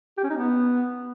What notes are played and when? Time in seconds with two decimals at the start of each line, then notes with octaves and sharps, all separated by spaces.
0.17 G4
0.23 C#4
0.30 D#4
0.36 B3